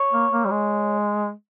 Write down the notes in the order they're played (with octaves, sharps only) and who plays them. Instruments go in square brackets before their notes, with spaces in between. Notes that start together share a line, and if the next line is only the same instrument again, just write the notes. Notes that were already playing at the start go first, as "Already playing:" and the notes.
Already playing: [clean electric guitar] C#5
[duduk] A#3
A#3
G3
G#3